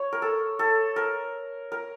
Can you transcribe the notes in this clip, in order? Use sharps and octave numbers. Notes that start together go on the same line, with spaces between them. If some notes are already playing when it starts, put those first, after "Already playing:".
Already playing: C#5
A#4
A4
A4
A#4
A#4